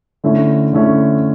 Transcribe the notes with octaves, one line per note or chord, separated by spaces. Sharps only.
D3 A3 C#4 E4
D3 A3 C#4 E4